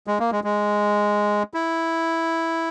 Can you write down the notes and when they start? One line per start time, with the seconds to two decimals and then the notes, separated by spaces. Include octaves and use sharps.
0.07 G#3
0.20 A#3
0.32 G#3
0.44 G#3
1.54 E4